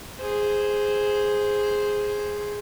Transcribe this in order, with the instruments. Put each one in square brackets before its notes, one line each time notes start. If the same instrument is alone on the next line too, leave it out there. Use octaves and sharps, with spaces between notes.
[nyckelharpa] G#4 C5